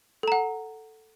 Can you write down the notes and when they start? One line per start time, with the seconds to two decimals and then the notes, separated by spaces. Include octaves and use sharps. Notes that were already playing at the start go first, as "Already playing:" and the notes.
0.23 A4
0.28 A#5
0.32 F#5